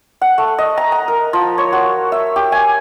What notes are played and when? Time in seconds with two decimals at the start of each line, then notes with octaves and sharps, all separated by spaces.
0.21 F#5
0.38 A3
0.58 D#5
0.77 A#5
0.92 A#5
1.08 A#4
1.33 F3
1.58 C#5
1.73 F#4
2.12 E5
2.36 G4
2.52 G#5